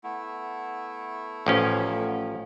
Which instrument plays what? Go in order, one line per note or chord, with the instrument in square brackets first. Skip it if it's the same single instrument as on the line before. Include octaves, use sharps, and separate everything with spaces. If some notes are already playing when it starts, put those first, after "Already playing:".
[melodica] A3 B3 E4
[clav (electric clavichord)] A1 F3 C#4